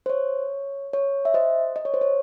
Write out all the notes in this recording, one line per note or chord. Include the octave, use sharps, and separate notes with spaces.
C5
C#5
C#5
E5
C5 D#5
D#5
C#5
C5
C#5